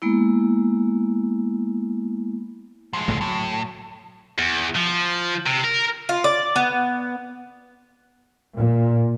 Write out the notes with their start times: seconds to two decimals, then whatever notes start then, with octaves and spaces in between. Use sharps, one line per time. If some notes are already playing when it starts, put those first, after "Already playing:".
0.02 G#3 A#3 B3 E4
2.93 F3 G#3
3.08 C#2 A2 D3
3.21 A2 F#3
4.38 E2
4.76 F3
5.46 C3
5.64 A#4
6.09 F4
6.24 D5
6.56 B3
8.57 A#2